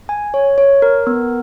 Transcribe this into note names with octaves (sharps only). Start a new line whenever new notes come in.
G#5
C#5
C#5
A#4
B3